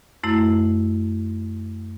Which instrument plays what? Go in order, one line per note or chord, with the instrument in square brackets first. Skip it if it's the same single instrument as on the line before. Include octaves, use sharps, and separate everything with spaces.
[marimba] F#2 A3 E4